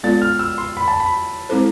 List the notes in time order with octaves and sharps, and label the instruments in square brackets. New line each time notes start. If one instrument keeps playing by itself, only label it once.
[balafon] G#3 B3 F4 A4 D5 [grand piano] A6
[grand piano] F6
E6
C6
B5
A5
B5
[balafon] G#3 C4 E4 A4 C5